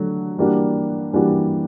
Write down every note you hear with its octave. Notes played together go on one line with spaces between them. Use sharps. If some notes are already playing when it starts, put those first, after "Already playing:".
Already playing: D3 F#3 A3
E3 G3 A#3 D4 F#4
E3 G3 A#3 D4 F#4